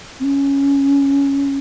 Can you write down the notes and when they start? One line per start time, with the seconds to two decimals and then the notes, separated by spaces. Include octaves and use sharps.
0.20 C4
0.24 C#4